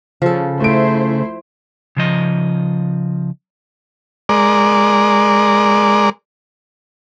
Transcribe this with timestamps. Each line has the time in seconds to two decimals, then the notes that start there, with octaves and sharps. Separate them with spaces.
0.22 C#3 F3 A4
0.60 A3 E4 C5 D7
1.97 C#3 F3 D#5
4.29 G#3 A#4 D5